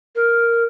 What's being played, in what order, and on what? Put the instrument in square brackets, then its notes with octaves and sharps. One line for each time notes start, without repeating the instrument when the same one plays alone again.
[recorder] A#4